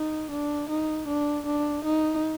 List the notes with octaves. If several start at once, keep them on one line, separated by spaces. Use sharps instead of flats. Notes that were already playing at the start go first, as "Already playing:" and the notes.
Already playing: D#4
D4
D#4
D4
D4
D#4